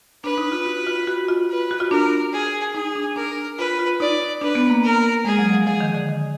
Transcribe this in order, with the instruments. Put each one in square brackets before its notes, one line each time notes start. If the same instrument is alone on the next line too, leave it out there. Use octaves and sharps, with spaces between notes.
[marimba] D4 [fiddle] B4
[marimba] D#4
F4
F#4
F4
F#4
F4
[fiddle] B4
[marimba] F#4
F4
[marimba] D4 [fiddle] A#4
[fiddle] G#4
[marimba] D#4 [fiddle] G#4
[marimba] D4
[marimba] D4 [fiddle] A#4
[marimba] F4 [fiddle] B4
[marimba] F4
[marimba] D#4 [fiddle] D5
[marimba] D4 [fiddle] B4
[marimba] B3
A#3
[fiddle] A#4
[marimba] G#3 [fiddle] G#4
[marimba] F#3
F3
[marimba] F3 [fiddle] G#4
[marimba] D#3
D3
D#3